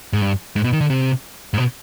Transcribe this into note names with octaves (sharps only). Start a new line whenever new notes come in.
G#2
G2
G#2
B2
D#3
D3
C3
G#2
B2